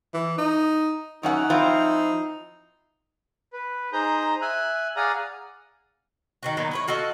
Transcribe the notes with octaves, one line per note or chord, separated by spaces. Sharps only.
E3
D#4
F#2 C#4 D#4 F#5
F3 C4 E4
B4
D#4 G#4 C5 A#5 G6
E5 G#5 F#6
G#4 D5 F5 F#5 G#5 A#5
D#3 F#3 F#4
A#2 D#3 F#3 B3
E4 B4 C#5
F4 F#4 A4 D#5